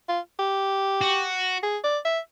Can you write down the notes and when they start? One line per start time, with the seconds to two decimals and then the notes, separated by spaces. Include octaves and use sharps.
0.08 F4
0.39 G4
1.01 F#4
1.63 G#4
1.84 D5
2.05 E5